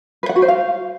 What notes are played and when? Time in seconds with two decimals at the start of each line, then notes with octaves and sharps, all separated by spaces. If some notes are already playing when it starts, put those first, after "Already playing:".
0.23 B4
0.29 F#5
0.36 F#4
0.42 C5
0.48 F5